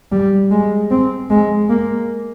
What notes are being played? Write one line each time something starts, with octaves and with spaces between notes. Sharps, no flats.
G3
G#3
C4
G#3
A#3